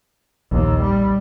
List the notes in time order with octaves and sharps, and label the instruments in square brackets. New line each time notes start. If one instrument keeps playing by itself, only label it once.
[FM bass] A#1 [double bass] D#2
[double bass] G3